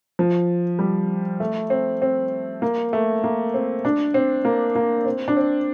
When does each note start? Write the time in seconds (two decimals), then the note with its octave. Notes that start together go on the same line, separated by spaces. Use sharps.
0.19 F3
0.79 G3
1.40 A3
1.70 C4
2.02 C4
2.62 A#3
2.93 A3
3.24 A#3
3.54 C4
3.85 D4
4.14 C4
4.45 A#3
4.76 A#3
5.05 C4
5.28 D4
5.37 C4